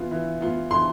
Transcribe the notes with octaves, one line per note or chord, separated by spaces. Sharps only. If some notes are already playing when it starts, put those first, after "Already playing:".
Already playing: E3 B3 F4
E3
B3 F4
E3 C6